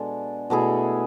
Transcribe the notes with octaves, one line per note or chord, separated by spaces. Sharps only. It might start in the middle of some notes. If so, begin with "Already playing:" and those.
Already playing: B2 G#3 D4 A4
B2 A3 E4 G#4